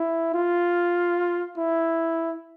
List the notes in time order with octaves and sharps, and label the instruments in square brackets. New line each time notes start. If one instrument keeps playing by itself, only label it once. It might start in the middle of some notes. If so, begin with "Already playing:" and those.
Already playing: [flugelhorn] E4
F4
E4